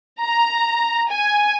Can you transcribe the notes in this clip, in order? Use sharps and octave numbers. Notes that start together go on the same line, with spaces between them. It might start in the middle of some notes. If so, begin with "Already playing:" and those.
A#5
G#5